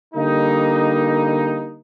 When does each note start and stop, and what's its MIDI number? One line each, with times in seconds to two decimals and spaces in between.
0.14 1.78 50
0.14 1.78 55
0.14 1.78 58
0.14 1.78 63